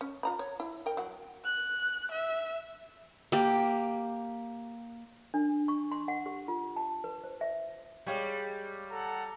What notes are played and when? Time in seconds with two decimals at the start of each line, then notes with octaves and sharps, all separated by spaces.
0.01 C#4
0.23 F4 A#5 B5
0.39 C#5
0.60 E4
0.86 A#4 G5
0.97 F#3 F#5
1.45 F#6
2.12 E5
3.32 A#3 G4
5.34 D4
5.68 C#6
5.92 C6
6.08 F#5
6.26 G4
6.48 F4
6.76 A5
7.04 B4
7.24 C5
7.41 E5
8.07 G3 G#3 G4 C#5 F5
8.91 A4 F#5 A#5